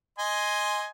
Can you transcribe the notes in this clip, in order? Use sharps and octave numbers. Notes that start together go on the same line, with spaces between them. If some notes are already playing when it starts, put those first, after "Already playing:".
D#5 G#5 C6